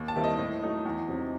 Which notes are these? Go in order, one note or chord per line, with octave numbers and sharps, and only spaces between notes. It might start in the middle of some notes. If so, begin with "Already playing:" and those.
Already playing: D#2
A5
D#3 G3 C4 E4
D#5
A2
F#3 A3 D#4
E2
C3 F#3 C4 D#4